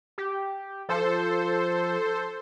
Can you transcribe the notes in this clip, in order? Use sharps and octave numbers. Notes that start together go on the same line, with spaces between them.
G4
F3 A4 C5